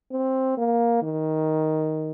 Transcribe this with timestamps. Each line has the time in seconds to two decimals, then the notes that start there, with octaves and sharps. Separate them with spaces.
0.11 C4
0.57 A#3
1.02 D#3